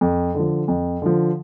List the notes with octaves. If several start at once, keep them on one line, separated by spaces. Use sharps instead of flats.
F2
D3 F3
F2
D3 F3